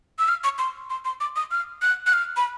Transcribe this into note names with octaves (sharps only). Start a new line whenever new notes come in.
E6
F6
C#6
C6
C6
C6
D6
D#6
F6
F#6
F#6
F6
B5